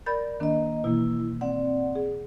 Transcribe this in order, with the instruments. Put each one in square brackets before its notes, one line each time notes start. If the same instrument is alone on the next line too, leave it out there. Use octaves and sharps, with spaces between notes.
[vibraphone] A#4 D5 [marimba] B5 G6 A6
[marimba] D#3 D4 [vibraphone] A#3 D#5
[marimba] B2 E3 A#3 [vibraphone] E4
[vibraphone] C4 D5 F#5
[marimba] G#4